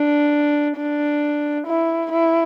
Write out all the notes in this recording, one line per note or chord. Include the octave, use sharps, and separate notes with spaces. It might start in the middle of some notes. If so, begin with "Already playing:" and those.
Already playing: D4
D4
E4
E4